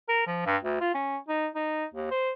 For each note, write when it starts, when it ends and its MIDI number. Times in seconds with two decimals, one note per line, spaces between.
0.09 0.23 70
0.27 0.42 53
0.46 0.57 43
0.63 0.78 38
0.81 0.94 65
0.95 1.17 61
1.29 1.47 63
1.55 1.85 63
1.94 2.11 39
2.11 2.32 72